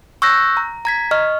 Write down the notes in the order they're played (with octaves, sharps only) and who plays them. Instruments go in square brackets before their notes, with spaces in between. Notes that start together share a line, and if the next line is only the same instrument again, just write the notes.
[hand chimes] C#6 E6 F#6 G6 A#6
A#5
A#5 G#6 B6
D#5 C#6 F6